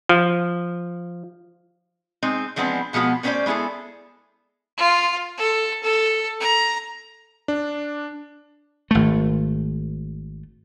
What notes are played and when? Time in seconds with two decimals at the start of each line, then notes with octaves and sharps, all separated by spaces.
0.09 F3
2.23 G#3 C4 D#4
2.56 E3 F3 G#3 B3 C4 D4
2.93 B2 F3 G#3 B3 F#4
3.23 A3 B3 C#4 B4 C5 D5
3.46 G#3 B3 E4 G#4 A4
4.77 F4
5.37 A4
5.83 A4
6.40 A#5
7.48 D4
8.91 G#1 A3